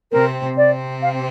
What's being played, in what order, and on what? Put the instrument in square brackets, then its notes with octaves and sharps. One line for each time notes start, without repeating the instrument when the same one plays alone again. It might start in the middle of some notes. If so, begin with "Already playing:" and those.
[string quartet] C3 C4 [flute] A#4
[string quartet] C3 C4 [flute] D5
[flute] F5